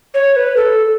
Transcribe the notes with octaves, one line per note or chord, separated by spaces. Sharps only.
C#5
B4
A4